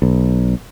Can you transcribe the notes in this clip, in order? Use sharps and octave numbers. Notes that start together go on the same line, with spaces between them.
B1